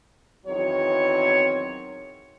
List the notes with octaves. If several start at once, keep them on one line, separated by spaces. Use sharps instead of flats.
E2 D#3 F#3 C4 C#5